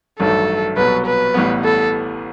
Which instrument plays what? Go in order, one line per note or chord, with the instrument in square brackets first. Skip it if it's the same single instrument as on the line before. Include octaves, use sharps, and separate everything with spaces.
[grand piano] A1 G2 D#3 F#3 A3 [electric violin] A4
[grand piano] C2 B2 F#3 [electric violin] B4
[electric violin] B4
[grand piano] A1 A2 G3 B3
[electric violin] A4